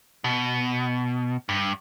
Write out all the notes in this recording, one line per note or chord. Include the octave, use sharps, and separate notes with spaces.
B2
G2